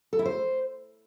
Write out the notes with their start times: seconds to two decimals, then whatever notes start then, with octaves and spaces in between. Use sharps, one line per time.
0.13 A4
0.19 E4
0.25 C5